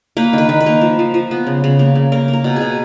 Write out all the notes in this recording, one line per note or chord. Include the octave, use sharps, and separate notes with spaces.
A#3 B4
D#3 B4
D#3
B4
A#3
F3
F3
F3
B3
C#3
C#3
A#3
C#3
A#3 A#4
A#3
A#4
B2
B2 G#4